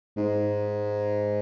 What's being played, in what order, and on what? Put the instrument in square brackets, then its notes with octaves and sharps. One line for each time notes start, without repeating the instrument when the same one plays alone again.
[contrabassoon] G#2